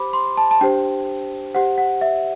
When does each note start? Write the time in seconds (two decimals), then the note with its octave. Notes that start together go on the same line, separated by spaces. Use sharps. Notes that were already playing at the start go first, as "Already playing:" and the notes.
Already playing: G4 C5 B5 D6
0.13 C6
0.37 A5
0.51 A5
0.61 D4 G4 C5 G5
1.54 G4 C5 F#5
1.78 F#5
2.01 E5